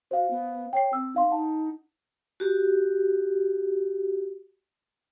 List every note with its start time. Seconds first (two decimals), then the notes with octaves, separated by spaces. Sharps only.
0.11 F#4 C5 F5
0.30 B3
0.73 C#5 G5 C7
0.93 C4 E6
1.15 D#4 F5 C6
1.31 D#4 F#5 A5
2.40 F#4 G4